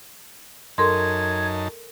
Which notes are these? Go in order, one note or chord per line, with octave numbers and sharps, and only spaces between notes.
F#2 D#4 A4 A#4 A5 C6 G#6